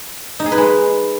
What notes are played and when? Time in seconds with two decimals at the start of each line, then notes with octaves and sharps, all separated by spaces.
0.40 D#4
0.46 G#4
0.52 B4
0.58 G#3